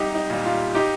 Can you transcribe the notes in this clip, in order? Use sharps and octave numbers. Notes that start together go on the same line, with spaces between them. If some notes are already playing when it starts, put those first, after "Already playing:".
Already playing: C2 D#4 G4
D#4
A#2 G3
F4
D#4 G4